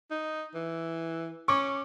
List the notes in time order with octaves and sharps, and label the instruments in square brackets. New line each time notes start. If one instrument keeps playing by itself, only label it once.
[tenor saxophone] D#4
E3
[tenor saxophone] C#4 [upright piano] C#6 D6